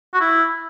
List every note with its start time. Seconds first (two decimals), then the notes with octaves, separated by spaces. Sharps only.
0.14 F#4
0.21 E4